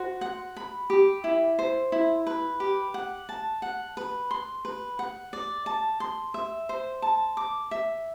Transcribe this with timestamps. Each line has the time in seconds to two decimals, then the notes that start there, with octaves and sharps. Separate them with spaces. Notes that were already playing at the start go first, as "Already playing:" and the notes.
Already playing: F#4 C5
0.21 F#5
0.57 B5
0.90 G4
1.24 E4
1.59 C5
1.92 E4
2.27 B4
2.60 G4
2.94 F#5
3.29 A5
3.62 F#5
3.97 B4
4.31 C6
4.65 B4
4.99 F#5
5.33 D5
5.66 A5
6.00 C6
6.34 E5
6.69 C5
7.02 A5
7.37 D6
7.71 E5